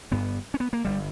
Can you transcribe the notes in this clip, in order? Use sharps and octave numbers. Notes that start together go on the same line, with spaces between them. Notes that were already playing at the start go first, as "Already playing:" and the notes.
G1 G2 B3
C#4
B3
A#3
G1 G2 G3